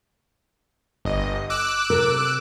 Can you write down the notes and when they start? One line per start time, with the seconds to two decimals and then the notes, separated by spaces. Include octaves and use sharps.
1.05 G1 D#5
1.50 D6 E6 F#6
1.90 C3 A4 A#4